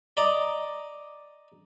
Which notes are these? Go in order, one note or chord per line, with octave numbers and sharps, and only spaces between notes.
D5 D#5 A#5 D6 D#6